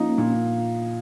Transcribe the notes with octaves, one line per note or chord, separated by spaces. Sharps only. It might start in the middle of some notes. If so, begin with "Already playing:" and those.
Already playing: F3 A#3 C#4 D#4
A#2